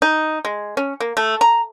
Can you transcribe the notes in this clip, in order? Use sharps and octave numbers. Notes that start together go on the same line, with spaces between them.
D#4
G#3
C#4
A#3
A3
A#5